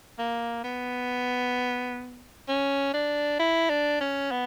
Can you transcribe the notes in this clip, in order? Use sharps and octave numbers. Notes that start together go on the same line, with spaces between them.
A#3
B3
C#4
D4
E4
D4
C#4
B3